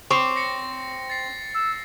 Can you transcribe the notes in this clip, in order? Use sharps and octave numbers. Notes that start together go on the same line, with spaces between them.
C4 C#5 C#6 D6
A#6 C#7
A6 C7
E6